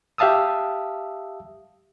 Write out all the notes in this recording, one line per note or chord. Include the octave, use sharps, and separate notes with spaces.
G4 E5 F5 A5 D#6 E6